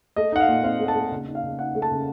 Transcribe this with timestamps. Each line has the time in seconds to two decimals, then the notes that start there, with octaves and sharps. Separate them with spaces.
0.16 A3 D#5
0.32 D#4 F#5
0.40 F5
0.48 A#2
0.64 C4 F5
0.80 A3
0.88 A5
0.95 A3
1.11 C#3
1.27 D#4
1.35 F5
1.43 C#3
1.59 D#4 F#5
1.75 A3
1.82 A5
1.91 C#3